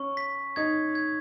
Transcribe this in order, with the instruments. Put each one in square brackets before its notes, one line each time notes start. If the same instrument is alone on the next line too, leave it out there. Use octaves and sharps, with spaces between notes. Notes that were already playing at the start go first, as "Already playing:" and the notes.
Already playing: [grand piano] C#4 [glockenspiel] C#6
[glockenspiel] B6
[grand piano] D#4 [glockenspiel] G#6
[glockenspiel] G#6